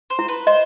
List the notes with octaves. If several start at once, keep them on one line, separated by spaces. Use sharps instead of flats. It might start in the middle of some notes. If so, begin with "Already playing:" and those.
C5
E4
B4
C5 D#5